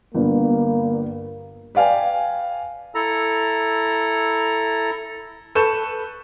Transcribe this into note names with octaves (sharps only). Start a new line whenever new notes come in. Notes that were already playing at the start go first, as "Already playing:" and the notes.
G1 G2 A#3
B4 D5 F5 G5 G#5
E4 A4 A#5
A4 B4 C#6 G6 E7